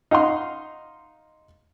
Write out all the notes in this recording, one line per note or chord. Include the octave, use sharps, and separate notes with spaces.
D#4 F5 F#5 C6